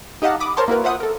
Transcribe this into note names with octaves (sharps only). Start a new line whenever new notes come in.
D#4 G4 D#5 F5 F#5 A5
B5 D6 D#6
A#4 C5 C#5 A5 C6
A#3 E4 F#4 A#4 B4
F4 C5 E5 F#5 D#6
A4 A#4